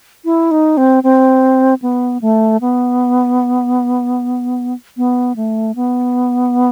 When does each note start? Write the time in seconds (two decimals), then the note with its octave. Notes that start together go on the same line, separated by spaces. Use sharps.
0.25 E4
0.51 D#4
0.77 C4
1.04 C4
1.82 B3
2.22 A3
2.61 B3
4.97 B3
5.36 A3
5.76 B3